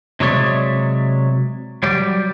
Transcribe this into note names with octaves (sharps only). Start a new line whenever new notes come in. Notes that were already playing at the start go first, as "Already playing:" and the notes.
C3 F#3 G#3 C#5 D5 E5
F#3 G3 D5